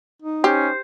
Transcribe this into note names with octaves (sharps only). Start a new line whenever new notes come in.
D#4
C#4 G4 C5